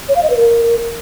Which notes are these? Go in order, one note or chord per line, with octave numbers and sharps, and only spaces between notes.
C#5
F5
D#5
B4
A#4